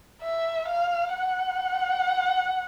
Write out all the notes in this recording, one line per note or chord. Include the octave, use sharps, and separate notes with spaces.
E5
F5
F#5